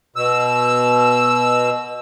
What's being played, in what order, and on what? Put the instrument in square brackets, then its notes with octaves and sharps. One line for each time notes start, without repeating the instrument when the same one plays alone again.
[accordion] B2 E6